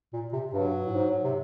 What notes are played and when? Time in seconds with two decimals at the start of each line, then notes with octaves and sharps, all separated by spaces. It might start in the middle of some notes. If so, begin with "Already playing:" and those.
0.13 A#2
0.33 C3
0.53 G2 F#3
0.87 A2
0.93 G#2
1.24 C3